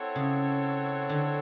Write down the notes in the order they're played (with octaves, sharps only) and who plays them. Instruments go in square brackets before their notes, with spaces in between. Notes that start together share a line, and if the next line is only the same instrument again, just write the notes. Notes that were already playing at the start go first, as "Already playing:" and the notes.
Already playing: [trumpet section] C4 E4 A4 C#5 F#5
[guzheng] C#3
D3